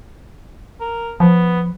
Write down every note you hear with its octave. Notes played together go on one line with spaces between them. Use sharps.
A#4
F3 B3